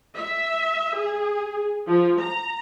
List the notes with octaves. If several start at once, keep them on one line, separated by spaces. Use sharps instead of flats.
E5
G#4
F3
A#5